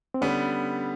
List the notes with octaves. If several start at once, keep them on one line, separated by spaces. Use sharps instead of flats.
C4
D3 G3 B3 C#4